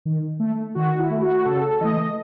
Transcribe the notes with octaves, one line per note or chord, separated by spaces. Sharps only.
D#3
A3
D#3 F#4
E4
A3
F#4
C#3 A4
E3 A3 D#5